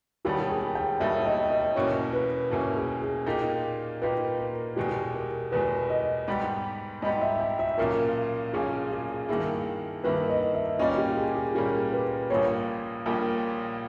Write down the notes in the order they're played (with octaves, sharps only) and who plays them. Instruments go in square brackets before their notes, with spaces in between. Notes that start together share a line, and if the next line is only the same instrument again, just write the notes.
[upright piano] E1 D#2 D#3 G3 B3 [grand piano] G4
[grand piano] G#4
G5
[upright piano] E1 D#2 D#3 G3 B3 [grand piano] E5
[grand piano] D#5
D#5
[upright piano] E2 B2 A#3 C#4 E4 [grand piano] C#5
[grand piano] B4
[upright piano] E2 B2 A#3 C#4 E4 [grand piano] A#4
[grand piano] G#4
G#4
[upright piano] A#2 A#3 D#4 G4
[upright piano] A#2 A#3 D#4 G4 [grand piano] B4
[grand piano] A#4
[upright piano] E2 B2 G#3 [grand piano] G4
[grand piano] A#4
[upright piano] E2 B2 G#3 [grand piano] B4
[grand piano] D#5
[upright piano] G#2 G3 B3 G4
[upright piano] G#2 G3 B3 G4 [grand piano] D#5
[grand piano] E5
G5
E5
[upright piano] B1 A#2 A#3 C#4 [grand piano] A#4
[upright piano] B1 A#2 A#3 C#4 [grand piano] G#4
[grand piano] G#4
[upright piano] G2 D#3 A#3 E4 [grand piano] G#4
[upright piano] G2 D#3 A#3 E4 [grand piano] B4
[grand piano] D#5
E5
[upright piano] A#2 G3 A#3 C#4 [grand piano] D#5
[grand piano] G4
G#4
G#4
[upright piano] A#2 G3 A#3 C#4 [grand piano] G4
[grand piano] B4
[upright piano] A#1 A#2 G3 A#3 [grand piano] C#5
[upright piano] A#1 A#2 G3 A#3